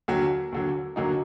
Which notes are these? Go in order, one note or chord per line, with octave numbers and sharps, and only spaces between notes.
D#2 D3 F#3
D#2 D3 F#3
D#2 D3 F#3 A#3 D#4